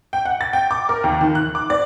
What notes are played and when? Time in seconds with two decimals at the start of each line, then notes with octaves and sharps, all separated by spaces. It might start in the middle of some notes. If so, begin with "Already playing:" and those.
0.13 G5
0.25 F#5
0.41 A6
0.53 G5
0.71 D6
0.89 A#4
1.04 D#2
1.21 D#3
1.35 F#6
1.55 D6
1.70 D5